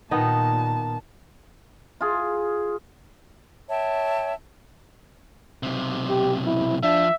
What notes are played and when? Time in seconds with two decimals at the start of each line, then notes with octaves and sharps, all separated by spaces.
0.11 A#2 D#3 B3 D#4 A5
2.01 F4 G#4
3.69 C#5 E5 G5 A5
5.63 B1 C3
6.09 G4
6.46 E4
6.83 F3 D4 E5